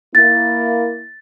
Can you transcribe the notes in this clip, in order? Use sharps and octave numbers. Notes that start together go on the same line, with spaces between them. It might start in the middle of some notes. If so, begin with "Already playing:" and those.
A#3 E4 A6